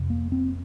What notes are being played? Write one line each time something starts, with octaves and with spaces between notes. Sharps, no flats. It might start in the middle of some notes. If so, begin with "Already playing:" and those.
Already playing: F2 C3
A#3
C4